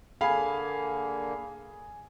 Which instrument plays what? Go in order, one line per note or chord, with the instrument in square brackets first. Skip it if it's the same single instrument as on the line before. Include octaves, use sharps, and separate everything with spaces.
[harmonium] D3 A#3 [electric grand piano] G#4 G#5 [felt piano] F5 B5